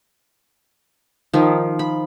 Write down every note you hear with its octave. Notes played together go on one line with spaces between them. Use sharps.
D#3 F3
B5